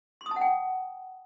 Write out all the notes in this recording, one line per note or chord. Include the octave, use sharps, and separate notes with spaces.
C6
D#6
A5
F#5
G5